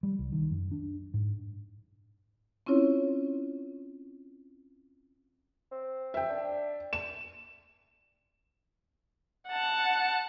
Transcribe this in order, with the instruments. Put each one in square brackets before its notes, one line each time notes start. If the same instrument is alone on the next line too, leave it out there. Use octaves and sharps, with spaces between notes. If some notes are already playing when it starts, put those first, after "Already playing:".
[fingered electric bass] G3
C2
D#3
F#2
D4
G#2
[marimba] C4 C#4 E4 F4 C#5
[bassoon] C4
[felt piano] E5 G5
[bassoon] D4
[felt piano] E7
[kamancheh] F#5 A5